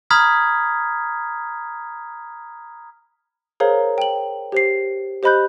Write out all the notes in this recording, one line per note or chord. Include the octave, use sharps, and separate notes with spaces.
A#5 B5 D#6 F6 G#6 B6
G#4 A#4 C5 C#5 F5 A#5
G5 F#7
G4 C5 C7
G4 C5 D#5 B5 F#6 G6